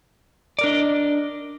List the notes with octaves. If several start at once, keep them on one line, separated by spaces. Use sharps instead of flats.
D4 A#4 D5 D#5